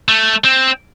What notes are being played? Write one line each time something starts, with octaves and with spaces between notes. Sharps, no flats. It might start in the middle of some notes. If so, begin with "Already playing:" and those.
A3
C4